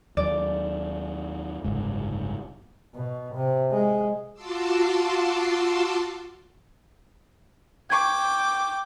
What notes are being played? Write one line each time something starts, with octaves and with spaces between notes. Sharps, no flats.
D#2 F#3 D5
F#1 C2 G#2
B2
C3
G#3
F4 F#4 A5 C6 D6 E6
G5 C#6 D6 G#6